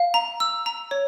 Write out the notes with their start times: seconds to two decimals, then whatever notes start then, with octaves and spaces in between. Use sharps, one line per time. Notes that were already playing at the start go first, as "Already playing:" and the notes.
Already playing: F5
0.14 A#5
0.40 E6
0.66 A#5
0.91 C#5